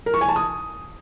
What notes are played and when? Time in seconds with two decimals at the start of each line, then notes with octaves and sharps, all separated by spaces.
0.06 A#4
0.14 C#6
0.21 G#5
0.29 A5
0.36 D#6